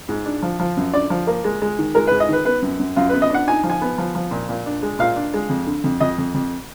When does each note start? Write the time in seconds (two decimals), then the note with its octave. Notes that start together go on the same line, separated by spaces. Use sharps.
0.09 G#2
0.26 D4
0.42 F3
0.60 F3
0.77 F#2
0.93 D3 D5
1.10 F3
1.27 A#3
1.44 G#3
1.62 G#3
1.79 D#3
1.95 G#3 A#4
2.07 G#2 B4
2.20 D#5
2.29 D#3 B4
2.45 B3 B4
2.62 F#2
2.80 F#2
2.96 F#2 F4
3.09 B4
3.13 B3
3.22 D#5
3.30 D4 F#5
3.47 D#4 G#5
3.63 F3
3.70 G#5
3.82 B3
3.98 F3
4.15 F3
4.31 A#2
4.49 A#2
4.66 D4
4.82 G#3
4.99 A#2 F5
5.16 D4
5.34 G#3
5.49 F2
5.67 D3
5.84 F2
6.00 F2 D#5
6.18 F2
6.34 F2